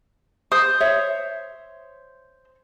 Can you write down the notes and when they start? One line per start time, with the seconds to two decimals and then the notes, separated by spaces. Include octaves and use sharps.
0.52 C5 D#6
0.80 C#5 E5